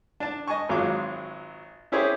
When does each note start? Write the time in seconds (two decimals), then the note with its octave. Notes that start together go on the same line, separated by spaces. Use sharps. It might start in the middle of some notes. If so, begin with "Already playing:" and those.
0.20 D4 A5
0.47 D#5 G#5 A5 C#6
0.69 G#1 F#3 G#3 F4 C#6 D6
1.92 C#4 E4 G4 G#4 C5 C#5